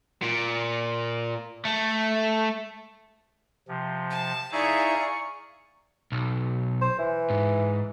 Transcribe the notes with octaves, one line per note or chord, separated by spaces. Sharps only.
A#2
A3
C3 F3
A5
D#4 E4 G#4 D5 E5 F5 A#5 C#6
B1
C5
E3
G#2